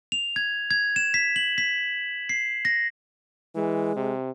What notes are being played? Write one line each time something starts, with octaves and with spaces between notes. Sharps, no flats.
F7
G#6
G#6
E7
B6
F#7
B6
C7
A#6
E3 G#3
C3